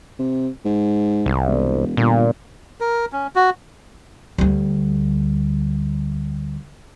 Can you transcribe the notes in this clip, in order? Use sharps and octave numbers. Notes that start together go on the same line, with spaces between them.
C3
G#2
C2
E1
G1 A#2
A#4
C#4
F#4
D2 G3